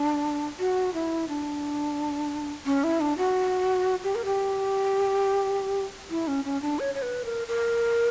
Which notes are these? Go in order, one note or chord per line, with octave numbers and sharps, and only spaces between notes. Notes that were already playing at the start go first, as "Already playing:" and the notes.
Already playing: D4
F#4
E4
D4
C#4
E4
D4
F#4
G4
A#4
G4
E4
C#4
C#4
D4
C#5
C#5
B4
A#4
A#4